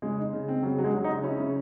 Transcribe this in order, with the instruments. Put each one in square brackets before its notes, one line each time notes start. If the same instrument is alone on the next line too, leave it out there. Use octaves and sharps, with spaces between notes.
[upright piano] C#3 [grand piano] G#3
[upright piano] D#4
C#3
C4
[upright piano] C#3 [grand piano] F#3
[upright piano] F#3
[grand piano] G#3
[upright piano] F#3
[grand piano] D#4
[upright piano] C#3
[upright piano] C#4 [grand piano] E4
[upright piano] C#3